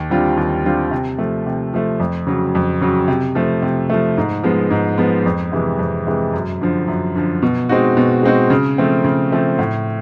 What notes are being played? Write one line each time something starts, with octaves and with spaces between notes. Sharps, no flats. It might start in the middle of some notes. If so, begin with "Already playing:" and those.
Already playing: D#2
D3 G3 C4 F4
D#2
D3 G3 C4 F4
C3
F3 A3
C3
F3 A3
F2
C#3 F#3
F2
C#3 F#3
C3
F3 A3
C3
F3 A3
G#2
F3 G#3 B3
G#2
F3 G#3 B3
F2
C3 E3 G#3
F2
C3 E3 G#3
F#2
D3 F3
F#2
D3 F3
B2
G#3 C4 D#4 F#4
B2
G#3 C4 D#4 F#4
C#3
F3 A3 C4
C#3
F3 A3 C4
A2